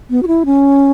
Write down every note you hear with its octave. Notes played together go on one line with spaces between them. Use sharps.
B3
F#4
E4
C#4